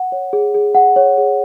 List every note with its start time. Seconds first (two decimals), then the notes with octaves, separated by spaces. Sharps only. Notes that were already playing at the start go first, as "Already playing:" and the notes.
Already playing: F#5
0.12 C#5
0.33 G#4
0.54 G#4
0.75 F#5
0.96 C#5
1.18 G#4